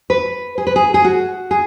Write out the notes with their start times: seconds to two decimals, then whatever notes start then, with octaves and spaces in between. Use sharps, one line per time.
0.10 B4
0.58 G#4
0.67 B4
0.76 G#4
0.94 G#4
1.04 F#4
1.51 G#4